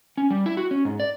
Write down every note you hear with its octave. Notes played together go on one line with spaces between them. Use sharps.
C#4
G3
E4
F#4
C#4
G#2
D5